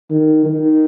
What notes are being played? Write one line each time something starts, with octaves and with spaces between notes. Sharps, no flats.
D#3
D#3